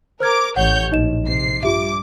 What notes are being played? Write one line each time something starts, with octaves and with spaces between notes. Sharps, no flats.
A#4 C5 D6 F6 G#6
A1 C#5 F#5 G6
A#1 D#4 D#5 E7
C3 C7
G2 F4 G4 E5 D6